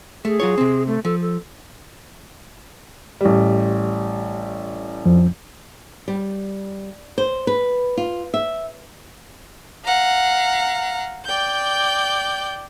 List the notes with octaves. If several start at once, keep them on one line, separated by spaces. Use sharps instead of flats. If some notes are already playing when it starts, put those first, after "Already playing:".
A3 G#4
F#3 F4 C#5
C3 C4
A3
F3 A4
A4
A1 G3
F2 F3
G3
C5
B4
F4
E5
F5 F#5 A#5
D5 G5 G6